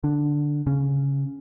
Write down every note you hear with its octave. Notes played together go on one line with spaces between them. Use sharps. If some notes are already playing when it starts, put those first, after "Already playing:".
D3 D4
C#3 C#4